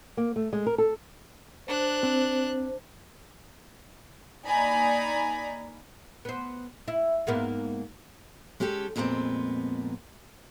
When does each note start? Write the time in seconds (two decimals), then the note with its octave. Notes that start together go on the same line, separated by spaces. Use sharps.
0.17 A#3
0.36 A3
0.53 G#3
0.67 A#4
0.78 A4
1.67 D4 C5 F#6
2.03 C4
4.46 A#3 D#4 D5 G#5 A#5 B5
6.25 B3 C5
6.88 E4
7.27 G#2 A#3 B3
8.60 G#3 C#4 G4 A4
8.96 F2 A#2 G#3 B3 C4